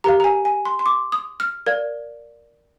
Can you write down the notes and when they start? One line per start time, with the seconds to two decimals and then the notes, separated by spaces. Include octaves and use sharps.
0.04 G4 A#4 F5 A#5
0.20 A#5
0.24 G#5
0.45 G#5
0.65 C6
0.79 C6
0.86 D6
1.12 D#6
1.40 F6
1.66 A#4 D5 F5 G#6